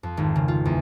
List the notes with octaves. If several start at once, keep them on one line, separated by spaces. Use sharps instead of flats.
F2
G#1
C#3
F4
E2